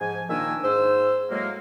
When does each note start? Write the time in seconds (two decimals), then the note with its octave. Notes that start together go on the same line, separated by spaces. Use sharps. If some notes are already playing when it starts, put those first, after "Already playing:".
0.01 G#2 F3 G#5
0.29 A#2 D#3 A#3 D4 G#5 E6
0.63 G#2 C5 E6
1.30 A2 F#3 G#3 A#3